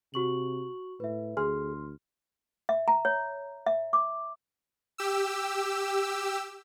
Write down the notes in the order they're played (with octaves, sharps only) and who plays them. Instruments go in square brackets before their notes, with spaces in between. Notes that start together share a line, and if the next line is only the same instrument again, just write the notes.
[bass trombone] C3 [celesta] F#4 C#6 F#7
[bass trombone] A2 [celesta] B4 E5
[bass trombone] D2 [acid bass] G#4 [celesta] C6 F6
[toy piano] E5
A#5
C#5
E5
D6
[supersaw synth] G4 E6